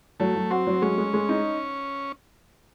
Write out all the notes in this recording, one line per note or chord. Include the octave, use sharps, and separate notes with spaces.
F#3 A3
F#3
C4 F#4
F#3
G#3 C#4
G#3
G#3
D#4